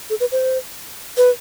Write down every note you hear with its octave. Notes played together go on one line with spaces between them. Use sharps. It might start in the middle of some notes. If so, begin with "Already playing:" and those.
A4
B4
C5
B4